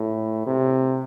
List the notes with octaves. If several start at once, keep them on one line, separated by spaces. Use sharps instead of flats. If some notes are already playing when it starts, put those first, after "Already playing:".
Already playing: A2
C3